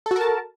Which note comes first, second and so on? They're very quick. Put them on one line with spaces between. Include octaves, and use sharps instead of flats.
A4 F#4 A#4 A5